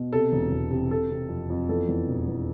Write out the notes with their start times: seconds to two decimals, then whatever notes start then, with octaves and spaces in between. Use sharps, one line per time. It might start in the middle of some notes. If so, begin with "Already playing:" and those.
Already playing: B2
0.12 C3 A4
0.32 E1
0.52 E1
0.71 C3
0.91 C3 A4
1.10 C3
1.29 F2
1.50 F2
1.69 E2 A4
1.88 E2
2.08 E1
2.27 E2